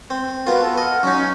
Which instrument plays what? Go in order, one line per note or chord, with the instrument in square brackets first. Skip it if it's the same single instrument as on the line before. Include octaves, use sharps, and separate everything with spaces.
[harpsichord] C4
[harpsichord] B3 F4 [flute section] F#4 A#4 B4
[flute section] A4
[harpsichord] D#5 [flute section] F#5 F6
[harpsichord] F#3 D#4 [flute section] C#4